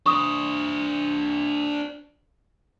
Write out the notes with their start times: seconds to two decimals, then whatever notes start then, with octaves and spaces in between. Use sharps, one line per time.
0.06 D4 C5 C#6 D#6